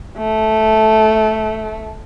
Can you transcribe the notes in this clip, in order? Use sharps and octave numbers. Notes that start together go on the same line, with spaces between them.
A3